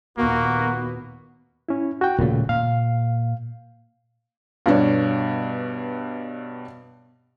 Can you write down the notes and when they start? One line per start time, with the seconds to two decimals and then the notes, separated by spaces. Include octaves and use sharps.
0.18 D#2 A#2 A#3 B3 F#4
1.69 C#4 E4
2.01 F#4 G5
2.19 D#1 A#2 C#3 A3
2.49 A#2 F5
4.66 G2 B2 D4 C#5